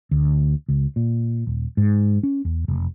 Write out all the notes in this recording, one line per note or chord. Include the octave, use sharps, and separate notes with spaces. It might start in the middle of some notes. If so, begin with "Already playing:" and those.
D2
C#2
A#2
D#1
G#2
C#4
E2
F1